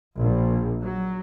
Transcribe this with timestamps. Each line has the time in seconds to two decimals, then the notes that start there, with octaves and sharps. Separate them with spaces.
0.19 A#1
0.82 F#3